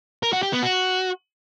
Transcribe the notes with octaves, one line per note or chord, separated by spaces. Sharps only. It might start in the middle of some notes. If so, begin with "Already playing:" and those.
A#4
F#4
G4
B3
F#4